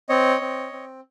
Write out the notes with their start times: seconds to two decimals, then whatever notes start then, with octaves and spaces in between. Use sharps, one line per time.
0.09 C4 C#5 D#5
0.41 C4
0.72 C4